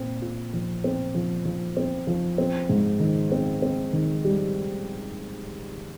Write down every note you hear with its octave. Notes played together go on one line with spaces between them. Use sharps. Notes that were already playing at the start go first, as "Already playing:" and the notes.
Already playing: A#2 C4
F4
F3
C4
F3
F3
C4
F3
C4
G#2
D#3
C4
C4
D#3
G3